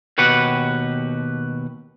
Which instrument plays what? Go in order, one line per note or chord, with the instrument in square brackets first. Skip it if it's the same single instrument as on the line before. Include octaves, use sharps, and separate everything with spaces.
[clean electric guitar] D#2 B2 F#4 G4 B4 F#5